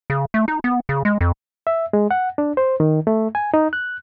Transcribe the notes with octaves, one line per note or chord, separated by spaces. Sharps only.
C#3
A3
D#4
B3
C#3
G#3
F2
E5
G#3
F#5
D4
C5
D#3
A3
G#5
D#4
F#6